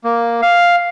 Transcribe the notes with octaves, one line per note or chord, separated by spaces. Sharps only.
A#3
F5